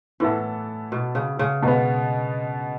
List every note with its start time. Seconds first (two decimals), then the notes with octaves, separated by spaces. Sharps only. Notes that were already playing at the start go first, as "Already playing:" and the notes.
0.20 A2 E3 B3 E4 A4
0.92 B2
1.15 C#3
1.39 C#3
1.63 B2 G#3 B3